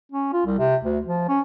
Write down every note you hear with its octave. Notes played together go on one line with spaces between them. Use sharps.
C#4
F4
C2
C3
D2
F3
C#4